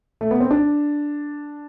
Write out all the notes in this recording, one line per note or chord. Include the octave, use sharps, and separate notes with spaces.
A3
B3
C4
D4